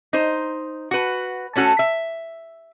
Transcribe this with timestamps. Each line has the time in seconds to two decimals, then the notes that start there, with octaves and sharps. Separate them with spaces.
0.13 D#4 C5
0.91 F#4 B4
1.56 A3 C#4 F#4 G#4 A4
1.79 E5